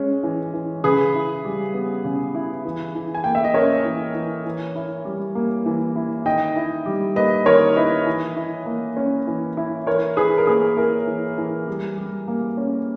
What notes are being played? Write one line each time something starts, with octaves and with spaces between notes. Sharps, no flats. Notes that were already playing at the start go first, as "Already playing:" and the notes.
Already playing: G#3 C#4
E3
E3
C#3 G#4 B4
E4
G3
B3
C#3
E4
E3
E3
G#5
A#3 G5
E5
D#5
C#4 A#4 C#5
E3
E3
E3
E4
G3
A#3
E3
E4
D#3 D#5 G5
E4
G3
A#3 B4 D#5
D#3 A#4 C#5
E4 B4 D#5
E3
E4
A#3
C#4
E3
E4
E3 A#4 C#5
E3 G#4 B4
A#4
A#3 G#4 B4
E4 A#4
E3
E3
G3
G3
A#3
C#4